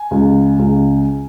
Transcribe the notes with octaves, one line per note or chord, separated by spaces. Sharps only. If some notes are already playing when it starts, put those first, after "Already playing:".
Already playing: G#5
C#2
C#2